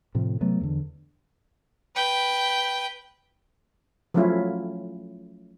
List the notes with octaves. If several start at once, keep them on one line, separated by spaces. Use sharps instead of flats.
A2 C3 F3
C3 F#3 A3 B3
E2 D3
B4 G5
F3 F#3 A3 C#4 E4 F4